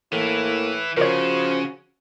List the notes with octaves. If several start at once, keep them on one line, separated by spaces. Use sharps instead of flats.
A2 E3 A#3
C#3 F3 F#4 A#4 C#5